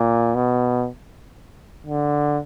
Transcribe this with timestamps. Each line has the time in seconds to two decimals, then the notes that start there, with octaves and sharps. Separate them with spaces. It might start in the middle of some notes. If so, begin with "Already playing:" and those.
Already playing: A#2
0.35 B2
1.86 D3